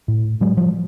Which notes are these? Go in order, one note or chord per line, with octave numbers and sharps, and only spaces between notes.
A2
A2 F#3 G#3
F3 G3